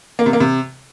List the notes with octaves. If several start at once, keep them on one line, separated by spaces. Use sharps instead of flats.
A#3
C3
A#3
C3